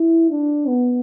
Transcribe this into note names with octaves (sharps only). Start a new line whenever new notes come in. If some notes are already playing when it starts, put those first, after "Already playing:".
Already playing: E4
D4
B3